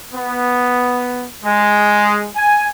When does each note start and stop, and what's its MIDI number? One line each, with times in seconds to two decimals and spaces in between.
0.14 1.27 59
1.45 2.28 56
2.36 2.66 80